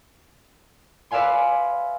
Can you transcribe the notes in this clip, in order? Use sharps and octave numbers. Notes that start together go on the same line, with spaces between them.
B4 D5 E5 F5 G#5 C6